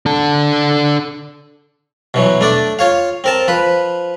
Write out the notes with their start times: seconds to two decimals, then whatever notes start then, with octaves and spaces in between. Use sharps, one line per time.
0.06 D4 A4
2.14 B2 E3 F#3
2.41 A3 D4 D5
2.79 F4 C#5 F5
3.24 C4 A#4 A5
3.48 F3 B4